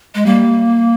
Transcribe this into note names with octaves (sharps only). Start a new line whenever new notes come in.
G#3
G3 A#3